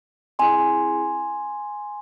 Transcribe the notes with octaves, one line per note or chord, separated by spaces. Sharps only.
C4 E4 G#4 G#5 C6